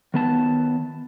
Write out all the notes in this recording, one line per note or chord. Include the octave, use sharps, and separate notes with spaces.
D#3 B3 A5